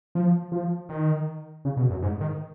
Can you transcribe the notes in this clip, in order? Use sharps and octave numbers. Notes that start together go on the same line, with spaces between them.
F3
F3
D#3
C#3
B2
F#2
G#2
D#3